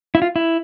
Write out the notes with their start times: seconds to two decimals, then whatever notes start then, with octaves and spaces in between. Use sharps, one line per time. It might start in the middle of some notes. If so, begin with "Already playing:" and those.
0.15 E4
0.22 F4
0.36 E4